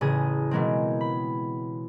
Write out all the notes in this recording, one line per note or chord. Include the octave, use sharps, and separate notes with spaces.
A1 C#3 G#4 D#6
B2 E3 G#3 A#3 C4
B5